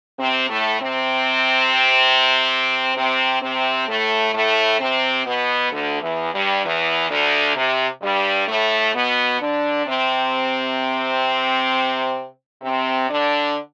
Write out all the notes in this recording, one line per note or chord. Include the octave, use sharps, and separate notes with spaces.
C3 C4
A2 A3
C3 C4
C3 C4
C3 C4
A2 A3
A2 A3
C3 C4
B2 B3
D2 D3
E2 E3
G2 G3
E2 E3
D2 D3
C3
G2 G3
A2 A3
B2 B3
D3 D4
C3 C4
C3 C4
D3 D4